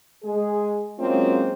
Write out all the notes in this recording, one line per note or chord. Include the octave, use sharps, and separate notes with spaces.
G#3 G#4
F#3 G#3 A#3 C4 C#4 F4